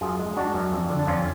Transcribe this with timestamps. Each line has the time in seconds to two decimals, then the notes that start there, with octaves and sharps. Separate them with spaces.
0.01 F#2 F4 G#4
0.19 G#3
0.37 G#3 D4 F#4
0.54 F#2
0.72 F2
0.90 D3
0.99 D4
1.07 F2 C#4 F4